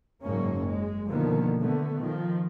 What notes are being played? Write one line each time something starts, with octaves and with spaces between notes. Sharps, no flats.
F#1 G#2 A#3 C#4
G#3
B2 D3 D#3 F3 A#3 B3
D3 A3 B3
D#3 F3